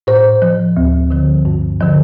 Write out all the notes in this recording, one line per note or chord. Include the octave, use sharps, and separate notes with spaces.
A2 C5
F3
D2
D3 F3
G2
D3 F3